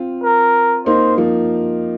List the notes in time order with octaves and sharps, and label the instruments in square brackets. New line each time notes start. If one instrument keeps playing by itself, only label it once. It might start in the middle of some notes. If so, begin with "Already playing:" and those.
Already playing: [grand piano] C4 F4
[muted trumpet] A#4
[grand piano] A#3 D#4 [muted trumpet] C5
[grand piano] F3 A#3